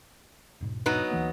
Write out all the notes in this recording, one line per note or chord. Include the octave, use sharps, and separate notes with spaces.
E1 G#2 B2
F#3 B3 D#4
D2 E3 A#3